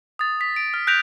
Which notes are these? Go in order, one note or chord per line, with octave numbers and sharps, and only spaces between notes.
D#6 A6
B6
D7
F6
F#6 G6 A#6 B6 D7 F7